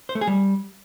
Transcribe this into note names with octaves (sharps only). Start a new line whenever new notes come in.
C5
A3
G#4
G3